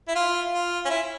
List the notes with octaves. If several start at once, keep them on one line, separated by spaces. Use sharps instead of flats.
E4
F4
F4
C#4
E4